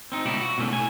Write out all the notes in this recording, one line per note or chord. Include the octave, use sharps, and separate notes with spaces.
C4 D#4
C#2 B2 E4 D5
F#4
B2 D3 E3 A3 C#4
A2 G#5